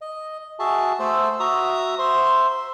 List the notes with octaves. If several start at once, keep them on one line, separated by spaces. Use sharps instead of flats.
D#5
F#4 G#4 E5 A5
A3 A4 C5 E6
F#4 E5 A#5 D#6
C5 E5 C6